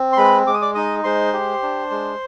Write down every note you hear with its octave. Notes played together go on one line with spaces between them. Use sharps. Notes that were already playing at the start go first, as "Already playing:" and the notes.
Already playing: C4
C6
G#3 B4 B5
G#3 D6
D#6
D5 D6
D#4 D#5 D#6
G#3 C5 C6
G4
D4
G#3